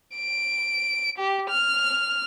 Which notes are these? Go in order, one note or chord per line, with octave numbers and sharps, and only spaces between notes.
D7
G4
F6